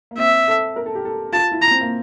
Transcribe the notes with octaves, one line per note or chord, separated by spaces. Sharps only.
A#3
C4 E5
A4
A#4
A4
G4
A4
F4 A5
E4
A#5
C4
A#3